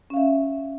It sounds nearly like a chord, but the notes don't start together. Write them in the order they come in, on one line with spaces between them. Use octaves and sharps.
C#4 F5 E5